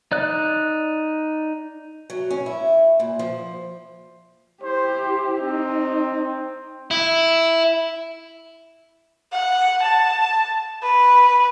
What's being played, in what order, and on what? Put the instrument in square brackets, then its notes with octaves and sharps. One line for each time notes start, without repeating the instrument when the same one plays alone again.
[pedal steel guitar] D#4 D5 F#6
[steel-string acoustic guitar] F#3
C#4
E4
A#2
F3
[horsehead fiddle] E4 G4 [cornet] C5
[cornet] C4 [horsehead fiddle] D#4
[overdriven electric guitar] E4
[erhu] F#5
A5
B4